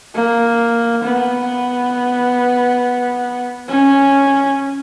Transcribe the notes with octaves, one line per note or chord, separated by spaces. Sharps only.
A#3
B3
C#4